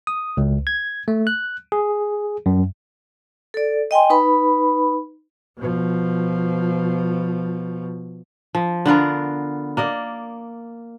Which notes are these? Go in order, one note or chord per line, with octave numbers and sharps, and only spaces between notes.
D#6
C#2
G#6
A3
F#6
G#4
F#2
A4 D5
D#5 G5 G#5 C6
D#4 B4 B5
B2 F3
F3
D3 B3 F4 A#4
A#3 D5 D#5